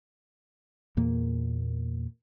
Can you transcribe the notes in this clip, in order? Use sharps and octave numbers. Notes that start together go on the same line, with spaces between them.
E2 A#2 A#3